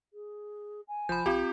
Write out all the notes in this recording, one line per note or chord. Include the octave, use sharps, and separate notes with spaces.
G#4
G#5
F1 F3 B5 G6
A#1 C4 F4 G4